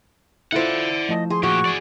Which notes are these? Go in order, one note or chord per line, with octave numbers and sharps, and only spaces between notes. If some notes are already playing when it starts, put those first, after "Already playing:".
E4 F4 A4 C5 D5 F5 F#5
F3 A3 D#5 A5
G#4 C6
A#2 F#4 G4 C#6
G#4 D5